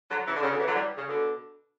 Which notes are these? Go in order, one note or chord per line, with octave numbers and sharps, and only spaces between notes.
D3 F#3
C#3 E3
D3
C#3
B2 D3
C#3 E3
D3 F#3
E3 G3
C#3
B2 D3